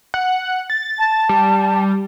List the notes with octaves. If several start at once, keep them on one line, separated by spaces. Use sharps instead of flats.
F#5
A6
A5
G3